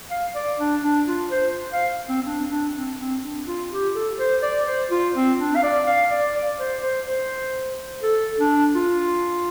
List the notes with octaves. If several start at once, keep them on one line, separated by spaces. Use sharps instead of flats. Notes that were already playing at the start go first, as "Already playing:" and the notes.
F5
D5
D4
D4
F4
C5
F5
C4
C4
D4
D4
C4
C4
D4
F4
G4
A4
C5
D5
C5
F4
C4
D4
F5
D5
F5
D5
D5
C5
C5
C5
A4
D4
F4